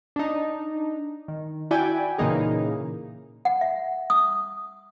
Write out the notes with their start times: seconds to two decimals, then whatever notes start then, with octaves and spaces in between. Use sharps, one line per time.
0.16 D4 D#4
1.28 D#3
1.71 E4 F#4 D5 G5 G#5
2.18 A#2 C#3 E3 A#3 D#4 G#4
3.45 F#5
3.61 E5
4.10 D#6